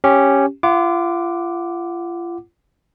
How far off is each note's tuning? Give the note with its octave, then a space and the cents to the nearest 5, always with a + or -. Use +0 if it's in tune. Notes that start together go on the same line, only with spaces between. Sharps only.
C#4 -5 G4 +0
F4 -35 F#5 +0 D6 +0